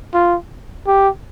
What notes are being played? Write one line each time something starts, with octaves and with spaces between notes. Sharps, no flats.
F4
G4